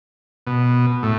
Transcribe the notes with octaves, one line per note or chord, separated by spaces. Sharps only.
B2
A2